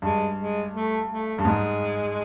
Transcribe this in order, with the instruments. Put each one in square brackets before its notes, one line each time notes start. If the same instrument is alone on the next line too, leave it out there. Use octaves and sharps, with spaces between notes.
[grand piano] G2 [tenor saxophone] G#3
[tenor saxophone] G#3
A3
A3
[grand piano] G2
[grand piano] G#2 [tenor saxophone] G#3